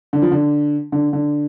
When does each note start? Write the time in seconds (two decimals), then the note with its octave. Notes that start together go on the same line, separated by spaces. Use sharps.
0.13 D3
0.22 F3
0.32 D3
0.92 D3
1.13 D3